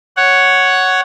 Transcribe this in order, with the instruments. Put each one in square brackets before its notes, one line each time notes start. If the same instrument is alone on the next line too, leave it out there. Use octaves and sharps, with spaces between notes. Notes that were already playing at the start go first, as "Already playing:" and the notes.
[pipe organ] C#5 F#5